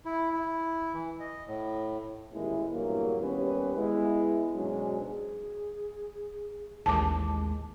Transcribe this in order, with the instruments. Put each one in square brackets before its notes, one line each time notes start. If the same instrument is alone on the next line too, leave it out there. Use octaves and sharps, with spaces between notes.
[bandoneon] E4
E4
E3
D#5
A2
[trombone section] A1 D#2 A#2 G#3 E4
E2 G2 A#2 F#3 A#3
D#2 G3 B3 C#4 B4
G#3 B3 E4
G#2 B2 F#3 G#3 C#4 D4
[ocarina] G#4
[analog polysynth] A1 D#2 G#3 [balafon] A5 D6